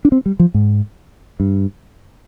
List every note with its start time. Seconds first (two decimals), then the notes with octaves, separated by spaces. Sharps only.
0.05 D4
0.12 C4
0.26 G3
0.40 F3
0.54 G#2
1.40 G2